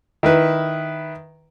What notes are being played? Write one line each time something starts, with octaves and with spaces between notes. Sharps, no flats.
D#3 E4 B4